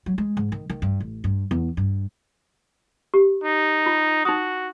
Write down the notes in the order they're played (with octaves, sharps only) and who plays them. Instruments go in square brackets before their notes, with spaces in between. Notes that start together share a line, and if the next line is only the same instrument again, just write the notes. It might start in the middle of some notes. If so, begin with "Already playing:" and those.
[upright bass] F#3
G#3
G#2
D#3
D#3
G2
A1
G2
E2
G2
[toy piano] G4
[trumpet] D#4
[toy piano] F4
[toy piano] D#4 D#6 [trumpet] F#4